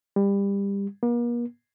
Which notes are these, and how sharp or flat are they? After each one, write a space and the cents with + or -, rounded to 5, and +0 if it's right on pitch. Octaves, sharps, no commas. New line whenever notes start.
G3 +25
A#3 +40